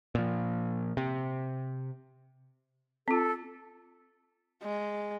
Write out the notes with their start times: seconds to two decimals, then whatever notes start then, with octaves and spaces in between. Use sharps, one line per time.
0.15 A#2 F3
0.97 C3
3.08 C4 F4 A4
4.63 G#3